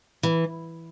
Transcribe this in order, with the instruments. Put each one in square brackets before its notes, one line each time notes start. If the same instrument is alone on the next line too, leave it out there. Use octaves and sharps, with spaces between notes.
[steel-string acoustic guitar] E3